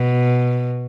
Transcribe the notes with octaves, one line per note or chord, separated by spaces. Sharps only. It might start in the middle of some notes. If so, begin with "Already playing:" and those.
Already playing: B2